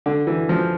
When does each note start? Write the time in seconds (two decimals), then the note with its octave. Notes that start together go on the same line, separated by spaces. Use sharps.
0.06 D3
0.27 E3
0.49 F3